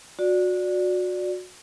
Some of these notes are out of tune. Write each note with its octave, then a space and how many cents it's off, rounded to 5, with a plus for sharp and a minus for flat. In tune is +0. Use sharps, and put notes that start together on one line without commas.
F#4 -25 D5 +0